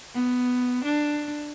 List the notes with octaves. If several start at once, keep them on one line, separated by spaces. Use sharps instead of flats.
B3
D4